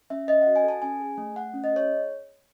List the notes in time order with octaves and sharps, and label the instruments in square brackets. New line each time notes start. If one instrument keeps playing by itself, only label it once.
[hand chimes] C#4 E5
C#4 D#5
F#5
F#4
G#5
A4 A5
C#4 G#5
G#4
A3
A3 F#5
C#4
D#5
G#4 C#5